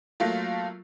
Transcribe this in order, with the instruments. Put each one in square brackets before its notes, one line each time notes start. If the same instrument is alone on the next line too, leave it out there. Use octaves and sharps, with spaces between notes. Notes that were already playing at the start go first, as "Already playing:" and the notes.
[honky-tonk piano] F#3 A3 A#3 F4